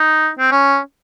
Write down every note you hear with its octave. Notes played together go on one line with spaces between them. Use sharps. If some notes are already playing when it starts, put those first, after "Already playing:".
Already playing: D#4
C4
C#4